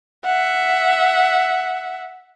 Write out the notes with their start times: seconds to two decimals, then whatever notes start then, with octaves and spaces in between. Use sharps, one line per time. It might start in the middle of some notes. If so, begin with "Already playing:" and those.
0.25 E5 F#5